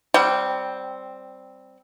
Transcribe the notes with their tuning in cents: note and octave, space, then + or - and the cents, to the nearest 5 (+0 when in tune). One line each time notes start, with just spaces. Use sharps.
G3 -10 C4 +0 F#5 +30